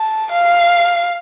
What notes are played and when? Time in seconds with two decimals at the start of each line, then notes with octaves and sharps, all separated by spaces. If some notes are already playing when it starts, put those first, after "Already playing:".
Already playing: A5
0.32 F5